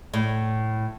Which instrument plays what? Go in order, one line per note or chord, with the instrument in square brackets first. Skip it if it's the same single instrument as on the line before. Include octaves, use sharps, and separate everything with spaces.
[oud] A2